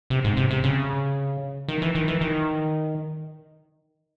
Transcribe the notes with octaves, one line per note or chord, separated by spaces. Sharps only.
C3
G#2
C3
C3
C#3
D#3
E3
D#3
E3
D#3